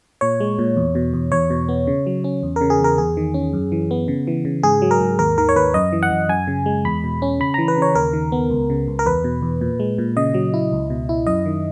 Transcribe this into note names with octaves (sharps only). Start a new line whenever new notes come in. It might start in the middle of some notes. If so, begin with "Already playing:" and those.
A#2 C#5
G#3
A#2
E2
B2
E2
E2 C#5
B2
B3
C#3
F#3
C#4
E2
A#4
C#3
G#4
E2
A#4
E2 G#4
D#3
C#4
F#2
E3
B3
C#3
E3
C#3
G#2 G#4
F#3
A#4
G#2
D#2 A#4
D#3 A#4
C#5
D#2 B4
F#2 D#5
E3
F#5
F#2
F#2 G#5
C#3
G#3
E2 B5
B2
C#4
C#3 B5
E3 A#5
B4
C#3 C#5
D#2 A#4
D#3
B3
C#2
C#3
C#2
A#4
E2 B4
B2
E2
A#2
G#3
A#2
C#3 D#5
F#3
E4
C#2
B2
E4
F#2 D#5
D#3